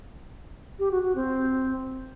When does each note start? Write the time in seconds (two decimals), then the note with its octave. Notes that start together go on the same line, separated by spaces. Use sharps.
0.79 G4
0.91 F#4
1.03 F#4
1.15 C4